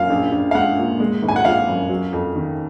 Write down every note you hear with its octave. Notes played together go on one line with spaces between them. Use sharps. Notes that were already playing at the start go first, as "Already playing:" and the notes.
Already playing: F#2 F5
A#1
A#1
F5
G#3 F#5
A#2
G#3
G#1
G#5
F#5
F3 F5
F#2
F#3
F2
D#3